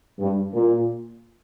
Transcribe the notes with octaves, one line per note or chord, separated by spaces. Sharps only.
G2
A#2